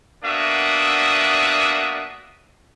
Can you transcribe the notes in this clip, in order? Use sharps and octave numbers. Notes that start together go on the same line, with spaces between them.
A#3 B3 D4 F#4 E5 D#6